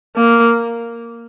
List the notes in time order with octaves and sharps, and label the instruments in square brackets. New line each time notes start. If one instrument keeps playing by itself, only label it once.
[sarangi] A#3